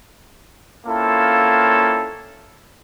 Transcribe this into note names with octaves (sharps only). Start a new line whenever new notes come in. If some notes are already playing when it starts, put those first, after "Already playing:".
A#3 C4 C#4 E4 F4 A4